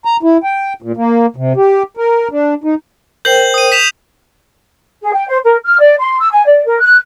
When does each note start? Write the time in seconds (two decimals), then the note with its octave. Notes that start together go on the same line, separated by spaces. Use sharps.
0.05 A#5
0.23 E4
0.44 G5
0.82 A#2
0.97 A#3
1.36 C3
1.56 G4
1.97 A#4
2.31 D4
2.64 D#4
3.25 A#4 C5 G5 G6 F#7
3.54 D#6 D#7
3.72 B6 E7 F7
5.03 G#4
5.14 G5
5.29 C5
5.43 A#4
5.65 F6
5.79 D5
5.99 C6
6.19 E6
6.32 G#5
6.45 D5
6.65 A#4
6.80 F#6